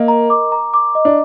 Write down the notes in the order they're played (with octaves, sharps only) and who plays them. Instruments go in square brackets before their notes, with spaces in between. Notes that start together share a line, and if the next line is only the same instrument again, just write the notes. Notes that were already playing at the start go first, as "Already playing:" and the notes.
Already playing: [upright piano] A#3 [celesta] A#4 D#5
[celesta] A#5
D6
A#5
D6
D#5
[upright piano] D4